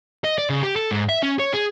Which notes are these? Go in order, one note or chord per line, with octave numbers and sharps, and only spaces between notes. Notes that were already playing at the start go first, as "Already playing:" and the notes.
D#5
D5
C#3
G4
A4
G#2
E5
C#4
C#5
G#4